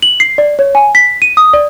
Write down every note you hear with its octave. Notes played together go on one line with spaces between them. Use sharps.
F#7
C7
D5
C#5
G#5
B6
D#7
D#6
D5